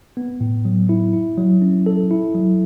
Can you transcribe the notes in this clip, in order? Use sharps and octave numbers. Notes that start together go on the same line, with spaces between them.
B3
A2
F#3
E4
E4
F#3
C#4
A4
E4
F#3